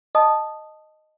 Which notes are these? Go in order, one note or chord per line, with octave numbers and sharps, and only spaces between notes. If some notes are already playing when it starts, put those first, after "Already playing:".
D#5 A5 D#6